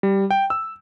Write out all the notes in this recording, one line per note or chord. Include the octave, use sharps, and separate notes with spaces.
G3
G5
E6